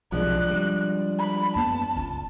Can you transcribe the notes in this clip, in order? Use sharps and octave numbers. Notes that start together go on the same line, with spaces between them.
B1 C3 F3 G#3 D4 F#6
G3
B5
F#2 A#3 B3 A5
F#1 C#2